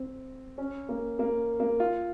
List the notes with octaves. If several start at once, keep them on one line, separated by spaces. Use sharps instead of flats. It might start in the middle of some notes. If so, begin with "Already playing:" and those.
Already playing: C4
C#4
A#3
A#3
A#3
F4